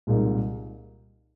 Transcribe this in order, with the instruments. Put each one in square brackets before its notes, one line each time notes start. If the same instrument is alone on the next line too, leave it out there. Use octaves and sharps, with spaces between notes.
[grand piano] C2 A#2 G#3 D#4 A#4